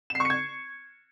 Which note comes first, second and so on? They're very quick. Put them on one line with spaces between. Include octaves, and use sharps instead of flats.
E7 C7 C#6 C#7 G#6